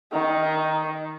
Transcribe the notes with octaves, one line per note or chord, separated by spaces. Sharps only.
D#3